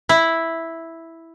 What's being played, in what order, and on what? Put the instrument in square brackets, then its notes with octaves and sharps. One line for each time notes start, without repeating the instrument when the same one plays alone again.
[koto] E4